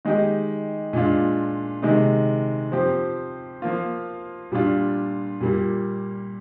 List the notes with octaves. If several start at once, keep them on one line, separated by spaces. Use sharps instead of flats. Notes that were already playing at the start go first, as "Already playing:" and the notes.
D#3 G#3 D#4 G4
A#2 G#3 D4 F4
C3 D#3 G#3
F3 C4 G4
F3 A#3 F4
A#2 G3 D4 F4
A#2 G3 A#3